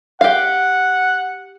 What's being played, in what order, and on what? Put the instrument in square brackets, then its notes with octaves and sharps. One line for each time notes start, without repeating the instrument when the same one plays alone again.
[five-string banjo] G4 F5 [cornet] F#5